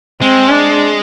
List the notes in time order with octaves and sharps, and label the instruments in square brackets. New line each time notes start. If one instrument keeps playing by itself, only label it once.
[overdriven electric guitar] G#3 [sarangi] C4
[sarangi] D4